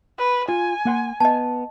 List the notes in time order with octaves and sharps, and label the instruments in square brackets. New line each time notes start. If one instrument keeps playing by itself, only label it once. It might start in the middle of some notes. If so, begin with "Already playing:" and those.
[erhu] B4
[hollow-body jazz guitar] F4 [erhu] G#5
[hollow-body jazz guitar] A#3 F#5 C6
[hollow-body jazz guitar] B3 [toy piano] D#5 A5